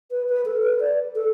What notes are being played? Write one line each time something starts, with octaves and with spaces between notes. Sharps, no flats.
B4
B4
A4
B4
D5
A4